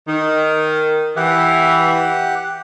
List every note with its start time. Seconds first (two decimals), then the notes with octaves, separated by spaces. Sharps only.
0.08 D#3
1.16 E3 G4 F#5